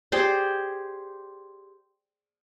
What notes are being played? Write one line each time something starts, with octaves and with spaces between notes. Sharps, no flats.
G4 G#4 C5 D5